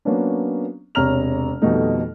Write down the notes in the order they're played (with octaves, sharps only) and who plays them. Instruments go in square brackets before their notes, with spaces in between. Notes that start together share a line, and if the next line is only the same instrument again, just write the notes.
[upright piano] F#3 A#3 B3 C#4 D4
E1 C3 C#5 A#5 F6 F7
F2 B2 D#3 G3 A3 D#4